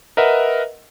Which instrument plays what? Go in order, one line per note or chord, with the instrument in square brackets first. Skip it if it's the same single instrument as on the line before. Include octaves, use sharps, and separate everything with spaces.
[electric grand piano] A#4 B4 D#5 E5 F#5